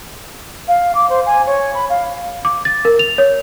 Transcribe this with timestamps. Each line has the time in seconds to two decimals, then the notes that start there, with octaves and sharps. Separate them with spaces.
0.68 F5
0.95 D6
1.09 C5
1.26 G#5
1.46 C#5
1.74 B5
1.89 F5
2.45 D6
2.65 A6
2.85 A#4
2.99 F7
3.18 C#5